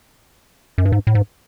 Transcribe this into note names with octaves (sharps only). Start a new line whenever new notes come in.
F#2
G2
G#2
A2
G#2